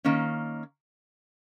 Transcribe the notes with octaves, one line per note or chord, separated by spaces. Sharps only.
D#3 A#3 C#4